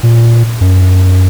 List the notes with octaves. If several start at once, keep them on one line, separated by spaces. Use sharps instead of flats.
A#2
F#2